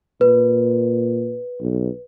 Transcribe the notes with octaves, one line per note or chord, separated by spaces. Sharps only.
A#2 B4
B1